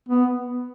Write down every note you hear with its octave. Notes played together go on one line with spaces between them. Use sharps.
B3